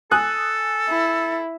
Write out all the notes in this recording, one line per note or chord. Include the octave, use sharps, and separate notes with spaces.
A4 G#5 D#6 F#6
E4